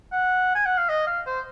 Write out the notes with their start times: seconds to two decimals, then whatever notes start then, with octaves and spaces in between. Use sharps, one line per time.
0.12 F#5
0.55 G#5
0.65 F#5
0.77 F5
0.89 D#5
1.07 F5
1.26 C5